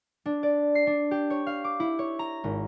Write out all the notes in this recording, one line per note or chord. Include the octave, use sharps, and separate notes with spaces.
D4
D5
C7
D4
G4
C#5
F5
D6
E4
C#5
A#5
G#1